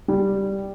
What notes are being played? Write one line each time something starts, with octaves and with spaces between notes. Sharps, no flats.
G3